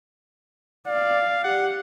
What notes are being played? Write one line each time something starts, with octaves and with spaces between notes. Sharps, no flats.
D5 F5
G4 F#5